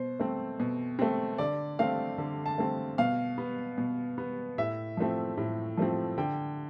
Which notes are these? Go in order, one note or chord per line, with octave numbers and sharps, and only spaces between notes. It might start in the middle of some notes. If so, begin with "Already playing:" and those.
Already playing: B2 C5
A3 C4
B2
A3 C4
D3 D5
A3 C4 F5
D3
A5
A3 C4
B2 F5
B3
B2
B3
A2 E5
F3 A3 C4
A2
F3 A3 C4
D3 G5